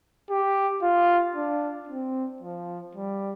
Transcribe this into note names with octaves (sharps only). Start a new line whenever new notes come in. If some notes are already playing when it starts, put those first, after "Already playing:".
G4
F4
D4
C4
F3
G3